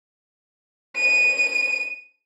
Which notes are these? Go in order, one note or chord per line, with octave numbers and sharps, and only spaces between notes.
D#7